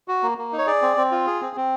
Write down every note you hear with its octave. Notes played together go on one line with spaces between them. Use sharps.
F#4
A#3
A#3
D#4
C#5
G#4 D5
C4
C4
F4
G#4
C4
C4